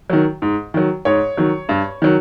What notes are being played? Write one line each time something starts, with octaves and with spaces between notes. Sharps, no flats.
D#3 F#3
G#2
D#3 F#3
G#2 C#5
D#3 F#3
G2
D#3 F#3